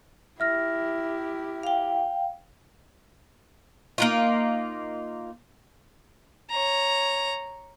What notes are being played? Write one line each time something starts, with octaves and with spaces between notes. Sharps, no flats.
E4 G4 E5 F6 A#6
F5 G5
A#3 D#4 F4
C#5 A#5